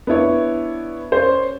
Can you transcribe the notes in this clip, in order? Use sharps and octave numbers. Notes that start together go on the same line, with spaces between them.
B3 D4 E4 C#5
C#4 C5 D5